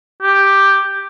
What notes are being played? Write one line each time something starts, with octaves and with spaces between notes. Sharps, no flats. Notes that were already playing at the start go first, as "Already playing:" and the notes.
G4